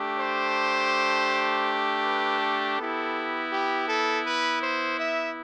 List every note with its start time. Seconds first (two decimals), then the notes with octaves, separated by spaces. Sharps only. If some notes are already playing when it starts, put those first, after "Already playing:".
Already playing: A3 D4 G4
0.19 C5
2.04 B4
2.41 A4
2.78 B3 E4 G4
3.52 G4
3.88 A4
4.26 B4
4.62 C5
5.00 E5